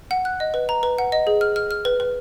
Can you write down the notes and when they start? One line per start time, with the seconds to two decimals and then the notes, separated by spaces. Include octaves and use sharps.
0.11 F#5
0.25 F#6
0.40 D#5
0.54 B4
0.69 A#5
0.83 B4
0.98 F#5
1.12 D#5
1.27 G#4
1.41 F6
1.56 F6
1.71 F6
1.85 B4
2.00 B4